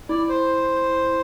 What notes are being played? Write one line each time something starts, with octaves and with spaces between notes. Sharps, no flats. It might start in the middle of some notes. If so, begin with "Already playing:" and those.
E4 D5
C5